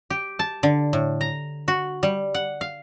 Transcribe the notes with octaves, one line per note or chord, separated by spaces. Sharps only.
G4
A5
D3
A2
A#5
F#4
G3
F#5
F5